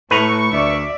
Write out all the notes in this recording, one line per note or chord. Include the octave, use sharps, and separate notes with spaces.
A2 A3 B4 A#5 C#6
D2 D5 E5